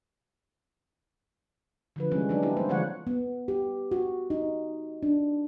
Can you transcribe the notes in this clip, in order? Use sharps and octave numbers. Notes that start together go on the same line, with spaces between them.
D3 F3 B4
C3 E3 G3 G#3 C#4
F#3 D4 D#4
C4 D4 E4 G4
G3 A#3 C5
D3 E3 F3 G#3 C#5 F#5
B3
G4
F#4
D#4
D4